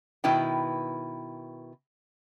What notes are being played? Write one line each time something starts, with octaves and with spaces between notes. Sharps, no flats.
B2 D#3 E4 B4 G5